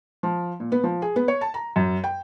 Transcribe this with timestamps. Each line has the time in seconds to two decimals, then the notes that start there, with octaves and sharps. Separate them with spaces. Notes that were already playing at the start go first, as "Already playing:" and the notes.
0.23 F3
0.60 A#2
0.72 B3
0.83 F3
1.02 G#4
1.16 B3
1.28 C#5
1.41 A5
1.54 A#5
1.76 F#2
2.04 G5